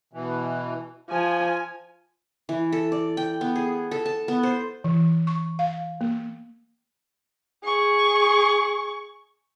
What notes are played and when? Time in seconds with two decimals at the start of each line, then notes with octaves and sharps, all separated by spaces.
0.13 B2 E3
1.10 F3 G#5
2.49 E3
2.72 A4
2.92 D5
3.17 G5
3.41 B3
3.56 G#4
3.91 A4
4.06 A5
4.28 B3
4.43 C5
4.84 E3
5.27 C#6
5.59 F5
6.01 A#3
7.64 G#4 C#6